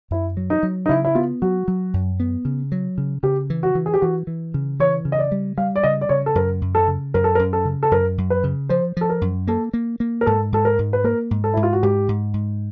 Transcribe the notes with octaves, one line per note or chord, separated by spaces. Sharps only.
F#2 E4
F#3
D#4
F#3
D#4
C#3 E4
E4
B3 F4
F#3 F#4
F#3
F#2
B3
C#3
F#3
C#3
C#3 G4
E3
F#4
E3
G#4
G4
E3 F#4
E3
C#3
E3 C#5
C#3
D#5
D5
G3
G3 F5
D5
C#3 D#5
D5
C#3 C#5
A4
F#2 A#4
F#2
A4
C#3
F#2 A#4
A4
A#4
F#2
A4
C#3
A4
F#2 A#4
F#2
B4
C#3
F3 C5
F3 A4
A#4
F#2
A#3 A4
A#3
A#3
A#4
G#2 A4
G#2 A4
A#4
G#2
B4
A#3 A#4
G#2
A4
G#2 E4
F4
F#4
G#2 G4
G#2
G#2